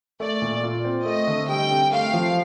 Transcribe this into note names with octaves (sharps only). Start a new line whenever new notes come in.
A3 D5
A#2
F4
C4
A3 D#5
D3
G3 G5
C3
A3 F5
F3